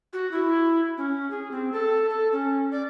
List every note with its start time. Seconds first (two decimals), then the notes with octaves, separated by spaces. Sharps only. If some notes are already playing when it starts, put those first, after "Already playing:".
0.13 F#4
0.32 E4
0.98 C#4
1.31 G#4
1.51 C4
1.72 A4
2.10 A4
2.32 C#4
2.71 D5